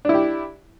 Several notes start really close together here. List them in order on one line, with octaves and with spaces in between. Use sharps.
D4 E4 G4